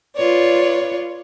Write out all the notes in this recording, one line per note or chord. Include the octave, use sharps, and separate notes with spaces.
F4 B4 C#5 D5